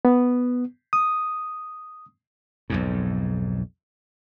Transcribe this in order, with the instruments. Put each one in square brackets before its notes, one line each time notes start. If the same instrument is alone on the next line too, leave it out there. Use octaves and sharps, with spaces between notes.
[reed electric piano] B3
D#6
[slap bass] B1 F2 G#2